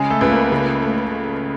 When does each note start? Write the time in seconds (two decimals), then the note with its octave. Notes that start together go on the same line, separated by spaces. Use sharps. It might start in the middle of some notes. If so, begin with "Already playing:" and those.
Already playing: C#3 G#3 G#4
0.10 A3 A4
0.21 C#2 B4
0.31 A#3 A#4
0.52 C#3
0.82 A3